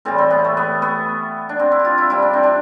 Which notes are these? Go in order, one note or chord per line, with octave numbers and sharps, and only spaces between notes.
A2 E3 G3 C4
C4
B3
A3
B3
B3
D4
C4
E4
G4
F4
E4
C3 G3 E4
D4
C4
D4